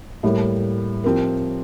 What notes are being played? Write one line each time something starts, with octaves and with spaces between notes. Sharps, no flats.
A2 G3 A#3
F3 C4 G4 A#4